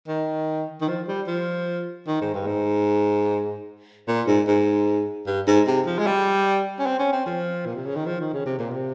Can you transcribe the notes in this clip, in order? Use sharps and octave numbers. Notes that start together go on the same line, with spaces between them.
D#3
D#3
F3
G3
F3
D#3
G#2
G2
G#2
A#2
G#2
G#2
G2
G#2
C3
F3
G#3
G3
C#4
C4
C#4
C4
F3
A#2
C3
C#3
D#3
F3
D#3
C#3
C3
A#2
C3